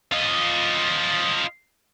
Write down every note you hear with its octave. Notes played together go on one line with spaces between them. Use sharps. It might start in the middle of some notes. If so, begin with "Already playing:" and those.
F4 D#5